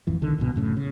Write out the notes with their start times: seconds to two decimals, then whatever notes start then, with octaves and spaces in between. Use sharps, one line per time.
0.07 A1 F2 E3
0.21 B1 D3 D#3
0.38 C2 G#2 B2
0.56 F#2 A2 C#3
0.77 C#3